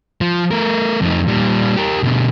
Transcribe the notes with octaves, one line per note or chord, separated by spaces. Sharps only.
F3
A3 A#4
F2 D#4
A#2 G3
G4 A#4
B2 D3